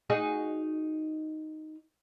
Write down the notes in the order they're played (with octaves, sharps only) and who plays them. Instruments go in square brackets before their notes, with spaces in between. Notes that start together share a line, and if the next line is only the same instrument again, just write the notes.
[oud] D#4 F#4 G#4